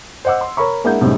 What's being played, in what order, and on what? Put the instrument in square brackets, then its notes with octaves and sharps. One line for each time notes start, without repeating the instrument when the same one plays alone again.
[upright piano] C5 D#5 F#5 D6 E6
C6
A#4 C#5 B5 C#6
G#3 A#3 D4 E4 F#5 G6
F#2 A2 C3 G3 G#3 D#4